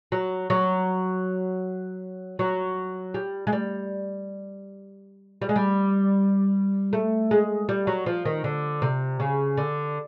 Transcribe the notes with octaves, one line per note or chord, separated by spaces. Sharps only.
F#3
F#3
F#3
G3
G#3
G3
G3
G#3
G3
A3
G#3
G3
F#3
F3
D#3
D3
C3
C#3
D3